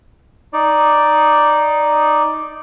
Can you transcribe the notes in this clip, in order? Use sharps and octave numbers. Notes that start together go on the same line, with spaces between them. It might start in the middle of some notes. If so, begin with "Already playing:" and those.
D#4 D5